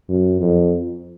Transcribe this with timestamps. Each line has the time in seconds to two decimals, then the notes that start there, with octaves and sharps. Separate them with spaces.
0.09 F#2
0.41 F2